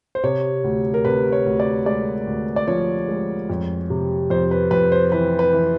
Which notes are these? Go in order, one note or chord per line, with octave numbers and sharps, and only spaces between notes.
C5
C3 C#5
D2
A#4
C3 B4
C#5
D2
D5
G#3 D5
D2
D5
F3 C#5
G#3
F2
C3
F2 C5
B4
F2 B4
C5
E3 B4
B4
E3